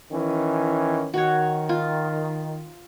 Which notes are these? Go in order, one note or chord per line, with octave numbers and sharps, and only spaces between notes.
D#3 E3 C#4
D#3 F#4 C#5
F4